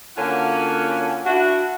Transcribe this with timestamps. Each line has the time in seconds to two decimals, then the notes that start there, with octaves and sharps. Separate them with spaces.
0.17 D3 A#3 C#4 F4 F#4
1.26 D4 E4 F#4